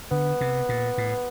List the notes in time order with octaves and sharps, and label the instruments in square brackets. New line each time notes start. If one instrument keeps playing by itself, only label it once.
[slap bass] D3 [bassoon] B3
[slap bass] C3
A#2
A2